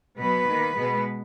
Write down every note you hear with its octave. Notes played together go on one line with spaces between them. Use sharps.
B2 F#3 B3 B4
D#3 A#3
B2 G#3 B3